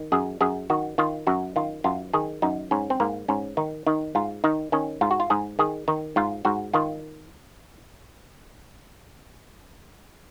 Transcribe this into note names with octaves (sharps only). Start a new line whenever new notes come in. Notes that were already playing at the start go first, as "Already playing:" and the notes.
Already playing: D#3
F#2 G#4
F#2 G#4
D#3 F#4
D#3 F4
F#2 F#4
D#3 F4
F#2 F4
D#3 G#4
F#2 D#4
G#2 C#4
C4
G#2 A#3
G#2 C#4
D#3 D#4
D#3 D#4
G#2 F4
D#3 D#4
D#3 C#4
G#2 F4
F#4
F4
G#2 G#4
D#3 G#4
D#3 D#4
G#2 F4
G#2 F#4
D#3 F4